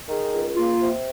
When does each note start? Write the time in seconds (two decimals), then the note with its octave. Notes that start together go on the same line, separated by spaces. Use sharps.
0.08 D#3 G#4
0.32 C#2
0.55 A#3 F4
0.79 C3